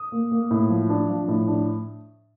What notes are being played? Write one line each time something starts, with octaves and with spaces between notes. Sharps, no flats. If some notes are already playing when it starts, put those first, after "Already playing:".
Already playing: D#6
A#3
A#3
A2
F3
D4
F3
A2
D4